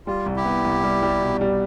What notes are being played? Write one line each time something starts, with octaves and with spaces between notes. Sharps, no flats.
G3 F4
C2
E4 G4
B3
C2
G3
G3
B2
G3